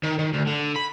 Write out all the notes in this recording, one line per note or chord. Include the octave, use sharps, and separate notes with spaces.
D#3
D#3
D2
D3
B5